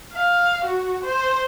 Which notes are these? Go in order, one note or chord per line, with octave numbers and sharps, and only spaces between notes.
F5
F#4
C5